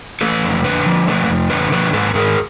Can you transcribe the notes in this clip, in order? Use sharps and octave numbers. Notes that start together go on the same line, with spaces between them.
A3 A4 B4
F2
D3 A4 B4
F3
A3 A4 B4
F2
D3 A4 B4
F3 A4 B4
G#2 A4 B4
G#2 G#4 A#4